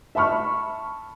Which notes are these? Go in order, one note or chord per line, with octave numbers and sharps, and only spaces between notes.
E5 A5 B5 C#6 F6